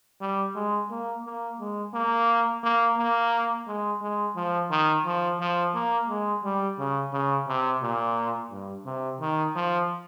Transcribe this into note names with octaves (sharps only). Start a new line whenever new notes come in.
G3
G#3
A#3
A#3
G#3
A#3
A#3
A#3
G#3
G#3
F3
D#3
F3
F3
A#3
G#3
G3
C#3
C#3
C3
A#2
G2
C3
D#3
F3